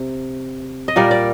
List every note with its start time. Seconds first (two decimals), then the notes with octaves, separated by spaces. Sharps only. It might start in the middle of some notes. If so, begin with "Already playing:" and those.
Already playing: C3
0.88 D#5
0.96 A#2 G3 A#4 D5
1.11 D5